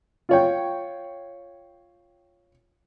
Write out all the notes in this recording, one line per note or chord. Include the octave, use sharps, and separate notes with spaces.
F4 C#5 G5